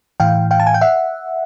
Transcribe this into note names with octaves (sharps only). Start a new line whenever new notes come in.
A2 E3 F5 G5
F5 G5
A5
G#5
G5
E5 F#5